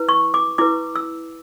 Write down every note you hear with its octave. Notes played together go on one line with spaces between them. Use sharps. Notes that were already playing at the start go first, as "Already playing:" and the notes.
Already playing: E4 B4
C#6
D6
E4 B4 D6
E6